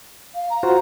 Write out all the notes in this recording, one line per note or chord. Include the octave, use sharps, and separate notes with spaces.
F5
A#5
F4 F#4 C5